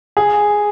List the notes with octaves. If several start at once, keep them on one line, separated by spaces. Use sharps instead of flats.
G#4